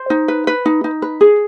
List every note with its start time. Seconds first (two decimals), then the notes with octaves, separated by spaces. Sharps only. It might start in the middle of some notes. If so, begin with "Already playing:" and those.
Already playing: C5
0.10 D#4
0.28 B4
0.47 B4
0.66 D#4
0.84 D#4
1.02 B4
1.21 G#4